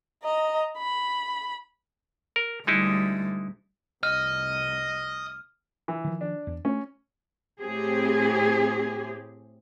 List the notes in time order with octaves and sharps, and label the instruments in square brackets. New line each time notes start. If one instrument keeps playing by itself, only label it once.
[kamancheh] D#5 A#5
B5
[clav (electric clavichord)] A#4
[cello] D2 G3 [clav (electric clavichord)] G#3 D#4 E4
[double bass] F1 C2 [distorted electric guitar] D#5 [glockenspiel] F6
[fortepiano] E3
[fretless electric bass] D#3 F3
[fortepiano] D4
[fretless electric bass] E2
[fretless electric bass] A3 [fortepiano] C#4
[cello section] A2 C4 G4 G#4